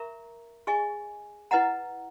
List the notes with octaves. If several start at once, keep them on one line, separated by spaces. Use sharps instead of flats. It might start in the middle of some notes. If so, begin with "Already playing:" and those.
Already playing: A#4 E5 A#5 C#6
G#4 D#5 G#5 C#6
E4 B4 D#5 F#5 A#5